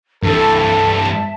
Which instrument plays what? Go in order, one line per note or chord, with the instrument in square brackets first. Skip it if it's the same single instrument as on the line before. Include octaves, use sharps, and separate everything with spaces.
[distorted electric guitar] G2 E3 [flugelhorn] A4 [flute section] E5 A5